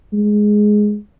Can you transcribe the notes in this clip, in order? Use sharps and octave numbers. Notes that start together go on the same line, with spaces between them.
G#3